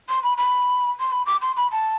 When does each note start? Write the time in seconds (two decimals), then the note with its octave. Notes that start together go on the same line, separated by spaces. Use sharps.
0.09 C6
0.23 B5
0.38 B5
0.99 C6
1.12 B5
1.26 D6
1.42 C6
1.57 B5
1.72 A5